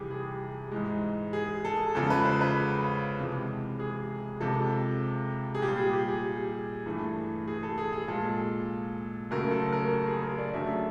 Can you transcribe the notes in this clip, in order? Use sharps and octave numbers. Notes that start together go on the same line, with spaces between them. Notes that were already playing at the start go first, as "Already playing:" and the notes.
Already playing: F2 C3 E3 G3 G4 G#4
G#4
G#2 E3 G#3
G#4
A4
E2 C#3 F3 G#3 A4
B4
C5
B4
F2 C3 E3 G#3
G#4
F2 C3 F3 G#3 A4
G#4
A#2 G4
G3
G#4
G4
G#4
G2 E3 A3
G#4
A4
G#4
G#4
A#2 F3 G#3 A4
F#2 C#3 F#3 A3 A#4
A4
A#4
A4
G#4
A#4
D5
F#2 D3 F#3 A3 E5